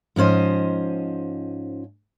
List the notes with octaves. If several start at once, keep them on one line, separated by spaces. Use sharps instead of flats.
G#2 F3 C#4 C5 D#5